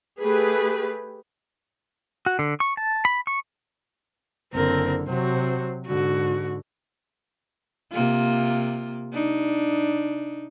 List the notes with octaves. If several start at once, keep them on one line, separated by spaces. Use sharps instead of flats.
A3 G4 G#4 B4
F#4
D3
C#6
A5
B5
C#6
F#1 D3 C4 A#4
C3 F#3 F#4 C5
G#2 D3 F#4
C3 A#3 F4
D4 D#4